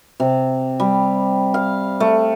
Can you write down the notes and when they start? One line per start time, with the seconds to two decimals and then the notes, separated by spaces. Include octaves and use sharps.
0.20 C3
0.80 G3
1.54 F5
2.00 A3